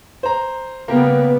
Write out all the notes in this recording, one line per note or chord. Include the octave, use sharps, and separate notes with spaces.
C5 A#5
C#3 G3 A#3 B3 G4 A#4